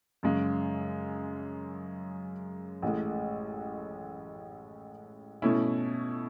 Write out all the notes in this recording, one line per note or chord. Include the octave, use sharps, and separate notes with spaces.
F#2 C#3 G#3
A1 A2 G#3
B2 A3 C#4 E4